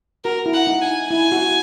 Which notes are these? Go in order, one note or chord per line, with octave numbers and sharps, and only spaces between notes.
F#4 A#4
E4
F#5
D#4
G#5
E4 G#5
F#4